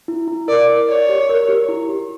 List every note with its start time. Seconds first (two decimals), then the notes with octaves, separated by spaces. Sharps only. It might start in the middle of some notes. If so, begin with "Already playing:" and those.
0.08 E4
0.28 E4
0.48 A#4 D5
0.68 A#4
0.89 C#5 D5
1.09 G4
1.29 A#4
1.49 G4
1.68 E4
1.89 G4